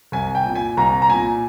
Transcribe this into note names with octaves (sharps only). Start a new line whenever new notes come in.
C2 G#5
G5
A#2
G#5
C2 A#5
A#5
A#2 G#5